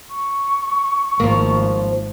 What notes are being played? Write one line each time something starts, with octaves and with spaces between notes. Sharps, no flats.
C#6
G#1 F3 A#3